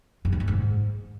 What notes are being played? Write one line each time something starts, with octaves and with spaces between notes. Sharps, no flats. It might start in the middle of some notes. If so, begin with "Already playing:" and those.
F#2
G#3
D#3
G#2